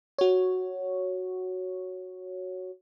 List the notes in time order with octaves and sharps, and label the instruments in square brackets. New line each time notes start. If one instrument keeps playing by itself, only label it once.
[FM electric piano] F#4 C#5